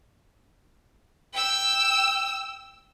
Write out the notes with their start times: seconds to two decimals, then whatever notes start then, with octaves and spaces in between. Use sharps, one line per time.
1.34 G5 E6